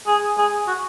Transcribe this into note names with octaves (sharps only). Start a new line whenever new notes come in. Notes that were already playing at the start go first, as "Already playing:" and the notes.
G#4
G#4
F#4